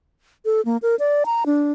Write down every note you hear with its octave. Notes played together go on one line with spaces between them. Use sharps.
A4
A#3
A#4
D5
A#5
D4